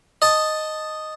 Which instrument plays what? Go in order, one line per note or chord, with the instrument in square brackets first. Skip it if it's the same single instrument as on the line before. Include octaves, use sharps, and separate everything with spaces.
[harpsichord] D#5 A5